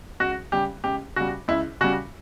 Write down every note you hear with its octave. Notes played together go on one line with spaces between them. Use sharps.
C#2 F#4
C#3 G3 G4
C#2 G4
C#3 G3 F#4
C#2 E4
C#3 G3 F#4